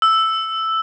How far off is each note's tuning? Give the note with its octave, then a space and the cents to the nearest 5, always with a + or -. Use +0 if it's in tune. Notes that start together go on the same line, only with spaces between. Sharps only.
E6 +0